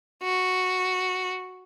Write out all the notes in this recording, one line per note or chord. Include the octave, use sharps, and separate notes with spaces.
F#4